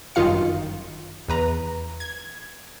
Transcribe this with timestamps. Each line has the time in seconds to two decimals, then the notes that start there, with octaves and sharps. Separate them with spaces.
0.15 G1 F#2 D#3 F4 F5 C#7
1.28 E2 B4 A#5
2.00 G#6